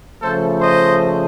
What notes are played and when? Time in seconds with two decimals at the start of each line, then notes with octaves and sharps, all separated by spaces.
0.22 C#3 F3 A3 A4 C5
0.61 C5 D#5